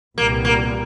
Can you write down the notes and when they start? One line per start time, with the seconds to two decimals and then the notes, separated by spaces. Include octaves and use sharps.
0.18 C2 A#2 G3 A#3 B3
0.45 A#3